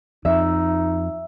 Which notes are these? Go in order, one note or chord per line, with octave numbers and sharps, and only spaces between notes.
F2 D#4 E5